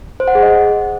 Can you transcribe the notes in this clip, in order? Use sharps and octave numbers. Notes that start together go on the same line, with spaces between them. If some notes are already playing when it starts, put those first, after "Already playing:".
C5
F#5
G#4
D#5